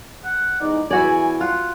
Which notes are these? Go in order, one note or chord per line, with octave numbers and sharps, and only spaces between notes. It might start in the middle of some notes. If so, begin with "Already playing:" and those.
F#5
E2 G#2 D#4 D5
E2 E3 E4 F#4 D5 G#5
F4 F#5